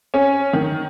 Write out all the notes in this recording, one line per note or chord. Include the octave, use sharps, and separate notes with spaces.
C#4
D#3